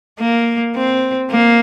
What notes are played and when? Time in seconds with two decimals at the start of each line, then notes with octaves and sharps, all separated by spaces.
0.20 A#3
0.76 C4
1.31 A#3